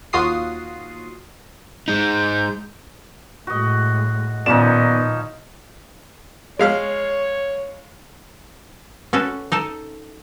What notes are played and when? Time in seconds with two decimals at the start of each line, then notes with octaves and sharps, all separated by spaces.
0.13 D#2 F4 F#4 D#6 C7
1.88 G#3 D#4 G6
3.47 A2 G#3 F#4 D#5
4.46 A#2 D#3 F3 B3 C#4 D#4 D5 E7
6.59 G#3 C#5 F5 F6
9.13 C#4 F#4 A4 B4
9.52 D#4 A4 A5